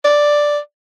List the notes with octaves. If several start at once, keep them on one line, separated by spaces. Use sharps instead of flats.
D5